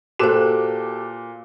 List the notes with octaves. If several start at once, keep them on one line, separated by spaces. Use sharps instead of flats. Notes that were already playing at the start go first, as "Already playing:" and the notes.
A#2 F#4 G4 A4 C5 D6 F#6 E7